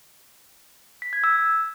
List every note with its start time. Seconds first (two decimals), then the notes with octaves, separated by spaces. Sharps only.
1.02 B6
1.13 G#6
1.24 E6